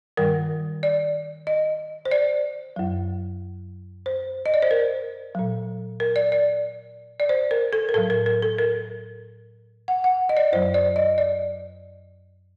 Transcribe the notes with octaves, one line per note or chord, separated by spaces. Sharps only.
G2 D#3 G3 A#4
D5
D#5
C5
D5
F#2 F#3
C5
D#5
D5
C5
A#4
A#2 F#3
A#4
D5
D5
D5
C5
A#4
A4
A#4
A2 F#3 A4
A#4
A#4
A4
A#4
F#5
F#5
D#5
D5
F#2 F#3 C5
D5
D#5
D5